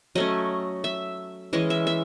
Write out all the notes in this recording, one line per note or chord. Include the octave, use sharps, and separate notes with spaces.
F#3 A3 C#4 D#5
E5
E3 G#3 C#4 D#5
E5
E5